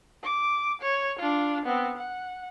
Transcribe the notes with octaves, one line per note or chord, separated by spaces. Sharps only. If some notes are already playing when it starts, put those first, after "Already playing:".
D6
C#5
D4 F4
B3 C4
F#5